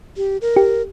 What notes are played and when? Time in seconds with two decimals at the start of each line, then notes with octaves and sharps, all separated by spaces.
0.17 G4
0.42 A#4
0.56 G4